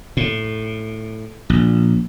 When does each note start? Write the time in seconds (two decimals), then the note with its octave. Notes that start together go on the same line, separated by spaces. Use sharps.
0.17 A2
1.50 A#1